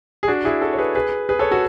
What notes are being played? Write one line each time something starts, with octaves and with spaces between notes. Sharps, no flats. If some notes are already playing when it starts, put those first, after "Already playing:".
G#4
D4 F#4
E4 G#4
F#4 A4
C#5
G#4 B4
G#4 B4
G#4 B4
A4 C#5
F#4 A4